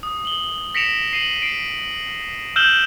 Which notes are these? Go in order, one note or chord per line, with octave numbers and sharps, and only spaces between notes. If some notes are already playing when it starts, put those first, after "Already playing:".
D#6
F#7 G7
A#6 B6 C#7 D7 E7 F7
C7 D#7 F7 F#7
C7 D7 E7
E6 F6 G6 E7 F#7 G7